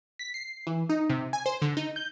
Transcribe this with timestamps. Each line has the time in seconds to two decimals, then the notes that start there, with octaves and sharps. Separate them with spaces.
0.19 B6
0.34 C7
0.67 E3
0.89 D#4
1.10 C3
1.33 G#5
1.46 C5
1.62 D3
1.77 D#4
1.96 G6